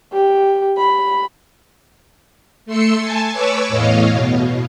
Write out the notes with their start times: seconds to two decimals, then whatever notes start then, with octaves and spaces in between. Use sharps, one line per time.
0.13 G4
0.78 B5
2.66 A3 C6 E6 C#7
3.01 G#5 A5
3.33 B4 C#5 C#6 D6 E6
3.69 E2 A2 C#5 D#5 F5
4.12 B2